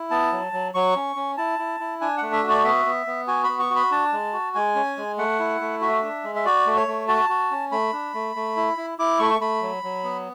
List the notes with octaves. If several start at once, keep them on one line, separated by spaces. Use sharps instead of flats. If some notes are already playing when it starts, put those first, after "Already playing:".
Already playing: E4
B3 A5
F#3
F#3
F#3 C#6
C#4
C#4
E4 A5
E4
E4
D4 G#5
A3 F#5
E5
F#4
D5
B3 E5
B3
B3
F#4 G#5
B3 B5
C#6
F#4
B5
D4 A5
G#3
F#4
G#3 G#5
C#4
G#3
A3 F#5
E4
A3
F#4 E5
D4
G#3
E5
F#4 D5
A3
C#5
A3
F#4 A5
F#4
C#4
A3 B5
D4
A3
A3
E4
E4
E4 D6
A3 C#6
A3 B5
F#3
F#3
B3